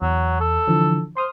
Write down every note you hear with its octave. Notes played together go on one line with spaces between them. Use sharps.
E2 F#3
A4
D3 E3 F3
C5 C6 D#6 F6